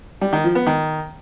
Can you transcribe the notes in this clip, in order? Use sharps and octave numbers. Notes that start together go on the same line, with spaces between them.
G3
D#3
F3
B3
D#3